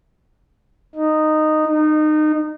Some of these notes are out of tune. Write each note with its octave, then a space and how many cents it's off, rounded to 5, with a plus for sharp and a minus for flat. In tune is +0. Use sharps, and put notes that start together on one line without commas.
D#4 -10
D#4 -25